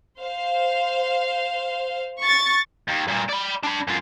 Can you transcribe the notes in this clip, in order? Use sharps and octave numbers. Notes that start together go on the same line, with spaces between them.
C5 F5
C#6 A6
D#2
G2 A#2
D5 B5
D4 B5
F#2 F4